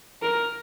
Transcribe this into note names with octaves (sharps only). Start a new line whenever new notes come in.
A#4